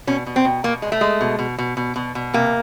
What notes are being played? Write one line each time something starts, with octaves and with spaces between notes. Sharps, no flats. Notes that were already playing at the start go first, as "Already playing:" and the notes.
B2 C#4
B2
C4
B2
B2 A#3
G#3
A3
G#3
B2
B2
B2
B2
B2
B2
C3 A#3